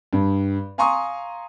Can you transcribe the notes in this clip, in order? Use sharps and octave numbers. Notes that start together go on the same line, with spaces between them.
G2
F5 G#5 A#5 C6 C#6 D#6